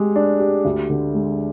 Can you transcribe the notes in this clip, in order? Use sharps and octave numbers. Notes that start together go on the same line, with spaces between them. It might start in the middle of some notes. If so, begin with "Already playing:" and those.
Already playing: G#3 G4
D4
G4
D2
D3
G#3